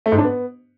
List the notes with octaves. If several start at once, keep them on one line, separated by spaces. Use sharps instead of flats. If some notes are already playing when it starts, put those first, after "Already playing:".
A3
G#2
D4
B3